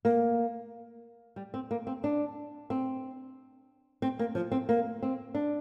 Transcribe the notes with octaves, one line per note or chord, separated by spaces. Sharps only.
A#3
G3
C4
A#3
C4
D4
C4
C4
A#3
F3
C4
A#3
C4
D4